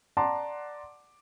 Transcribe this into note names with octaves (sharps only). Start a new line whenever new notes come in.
D5 F#5 A5 A#5 C6 D6